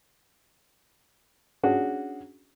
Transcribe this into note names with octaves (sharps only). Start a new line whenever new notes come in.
C#4 D4 F#4 G#4